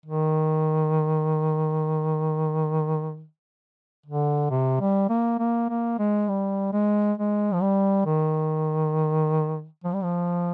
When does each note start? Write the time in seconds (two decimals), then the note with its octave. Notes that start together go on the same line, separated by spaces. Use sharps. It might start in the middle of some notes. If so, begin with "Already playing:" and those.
0.06 D#3
4.06 D3
4.50 C3
4.80 G3
5.10 A#3
5.39 A#3
5.69 A#3
5.99 G#3
6.29 G3
6.73 G#3
7.18 G#3
7.53 F3
7.62 G3
8.06 D#3
9.84 F3
9.94 G3
10.03 F3